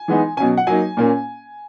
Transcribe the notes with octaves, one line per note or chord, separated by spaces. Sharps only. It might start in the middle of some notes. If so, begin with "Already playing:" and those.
Already playing: G#5
E3 G#3 B3 D#4
B2 F#3 C#4 G#5
F#5
F#3 A#3 D#4 G#5
A#2 A#3 C#4